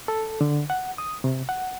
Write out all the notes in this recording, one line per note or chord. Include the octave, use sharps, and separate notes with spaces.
A4
D3
F#5
D#6
C3
F#5